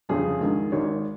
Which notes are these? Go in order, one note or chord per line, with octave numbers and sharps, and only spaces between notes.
G1 F2 C#3 G#4
A#1 G#2 D#3
G#1 G#2 D#3 C#5